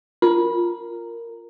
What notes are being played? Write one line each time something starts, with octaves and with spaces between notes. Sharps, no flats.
F4 A#4